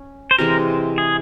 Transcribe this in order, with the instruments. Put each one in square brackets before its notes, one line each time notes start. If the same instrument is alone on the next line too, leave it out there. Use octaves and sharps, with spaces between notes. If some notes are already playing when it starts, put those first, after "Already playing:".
Already playing: [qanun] C#4
[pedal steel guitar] C5
[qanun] C3 E3 G#3 [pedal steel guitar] A#4
[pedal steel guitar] G#4